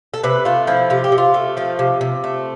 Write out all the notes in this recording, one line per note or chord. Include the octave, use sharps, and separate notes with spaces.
A4
C3 B4
A3 F4
F3 E4
C3 F4
G4
C3
F4
A3
F3 F4
C3
C3
A3